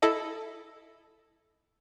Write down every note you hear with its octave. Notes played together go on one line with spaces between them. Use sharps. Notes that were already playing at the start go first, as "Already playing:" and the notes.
E4 A4 D#5